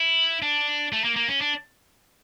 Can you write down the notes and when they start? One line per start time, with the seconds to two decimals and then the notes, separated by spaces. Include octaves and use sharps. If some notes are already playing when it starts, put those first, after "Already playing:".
Already playing: E4
0.42 D4
0.93 A3
1.04 A#3
1.16 A#3
1.28 C#4
1.41 D4